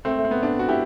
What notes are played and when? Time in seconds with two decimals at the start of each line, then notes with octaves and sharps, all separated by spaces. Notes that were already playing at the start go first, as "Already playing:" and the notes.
0.05 A3 C4
0.18 A3
0.24 C4
0.31 B3
0.43 B3 D4
0.59 F#4
0.69 E4 G4